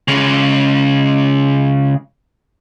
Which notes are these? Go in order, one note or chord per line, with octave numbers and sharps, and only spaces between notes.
C#3 G#3